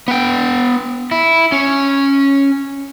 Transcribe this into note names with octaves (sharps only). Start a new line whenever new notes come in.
B3 G5
E4
C#4